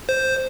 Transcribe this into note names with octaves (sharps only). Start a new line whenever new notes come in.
C5